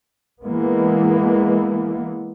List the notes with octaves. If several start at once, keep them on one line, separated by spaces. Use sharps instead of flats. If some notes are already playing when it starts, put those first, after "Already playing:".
E3 G#3 A#3 B3